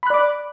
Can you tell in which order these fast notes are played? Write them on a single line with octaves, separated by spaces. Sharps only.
B5 F#6 D5 D6